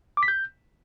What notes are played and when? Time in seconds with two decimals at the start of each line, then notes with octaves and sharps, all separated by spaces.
0.17 D6
0.23 B6
0.28 G6